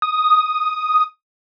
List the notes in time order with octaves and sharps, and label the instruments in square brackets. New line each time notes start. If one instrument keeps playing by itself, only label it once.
[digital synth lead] D#6